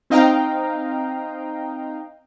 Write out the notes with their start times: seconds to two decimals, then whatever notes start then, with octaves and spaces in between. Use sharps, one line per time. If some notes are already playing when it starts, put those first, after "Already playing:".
0.10 C4 D#4 D#5 F5 G5 A#5